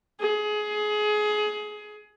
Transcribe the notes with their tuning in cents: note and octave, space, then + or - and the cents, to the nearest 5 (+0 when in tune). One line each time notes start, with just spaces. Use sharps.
G#4 +25